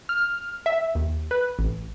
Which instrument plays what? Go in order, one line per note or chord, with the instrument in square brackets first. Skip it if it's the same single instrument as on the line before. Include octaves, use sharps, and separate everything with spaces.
[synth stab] F6
E5
D#2
B4
A1